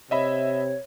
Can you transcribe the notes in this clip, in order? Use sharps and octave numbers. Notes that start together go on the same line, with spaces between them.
C3 C#5 D#5 E5 B5